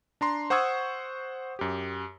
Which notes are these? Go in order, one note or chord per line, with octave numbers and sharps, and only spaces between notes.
D4 A#5 C6
C5 F#5 C#6 D#6 E6 G#6
F#2 G4